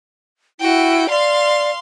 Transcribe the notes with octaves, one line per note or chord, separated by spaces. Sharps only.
E4 F#4 G5
D5 F5 C6